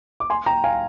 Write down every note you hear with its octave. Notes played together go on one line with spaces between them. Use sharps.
D6
G#5 C6
G5 A#5
F5 G#5